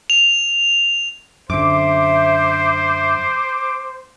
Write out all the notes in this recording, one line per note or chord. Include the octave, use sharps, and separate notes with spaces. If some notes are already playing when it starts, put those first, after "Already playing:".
F7
F#2 D3 C5 E5 D6